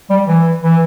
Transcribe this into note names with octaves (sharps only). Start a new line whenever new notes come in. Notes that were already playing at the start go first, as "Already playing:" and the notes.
G3
E3
E3